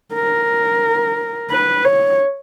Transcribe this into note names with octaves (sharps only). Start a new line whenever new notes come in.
A#4
B4
C#5